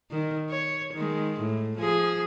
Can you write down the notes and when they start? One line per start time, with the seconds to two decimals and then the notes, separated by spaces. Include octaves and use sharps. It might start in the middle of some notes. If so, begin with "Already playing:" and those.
0.11 D#3
0.50 C#5
0.94 D#3 G#3
1.41 A2
1.79 F3 G#4